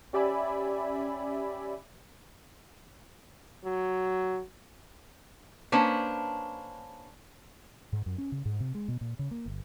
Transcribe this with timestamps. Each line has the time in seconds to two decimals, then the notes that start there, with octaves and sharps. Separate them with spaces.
0.13 C#4 G4 D5 E5 G#5 B5
3.65 F#3
5.72 A#3 C#4 D4 B4 C5
7.93 G#2
8.06 F#2
8.18 C#4
8.32 C#3
8.45 G#2
8.60 C3
8.75 G#3
8.88 B2
9.01 A#2
9.19 C#3
9.31 A#3
9.46 G1